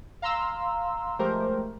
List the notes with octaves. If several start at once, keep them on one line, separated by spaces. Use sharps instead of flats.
F5 A#5 C6 E6
F3 G#3 A3 G4 A#4 C5